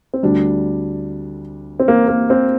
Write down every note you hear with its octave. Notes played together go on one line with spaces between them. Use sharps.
C4
D2 D3 G3 D4
C4
A#3
A#3
C4